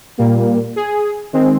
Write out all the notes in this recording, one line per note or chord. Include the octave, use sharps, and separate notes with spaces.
A#2 G3 A#3
G#4
D#3 G#3 C4